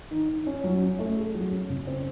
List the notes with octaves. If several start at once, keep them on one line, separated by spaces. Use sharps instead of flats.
D#3
D#3
C#4
F#3
C#4
A3
G#4
F#3
C#4
C#3
C4